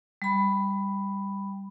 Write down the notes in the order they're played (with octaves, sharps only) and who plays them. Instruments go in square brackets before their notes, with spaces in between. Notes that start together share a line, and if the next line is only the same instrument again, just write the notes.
[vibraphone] G3 B5